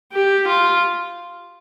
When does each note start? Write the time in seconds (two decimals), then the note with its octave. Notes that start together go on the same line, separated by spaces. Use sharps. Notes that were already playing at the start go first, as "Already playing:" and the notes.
0.13 G4
0.47 F4